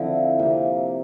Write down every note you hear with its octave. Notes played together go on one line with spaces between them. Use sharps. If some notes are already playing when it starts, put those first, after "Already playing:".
Already playing: D3 F3 C4 E4
C3 F3 A#3